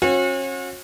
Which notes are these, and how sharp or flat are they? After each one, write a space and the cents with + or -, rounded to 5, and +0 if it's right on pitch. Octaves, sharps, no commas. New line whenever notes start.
C#4 -35 F#4 -40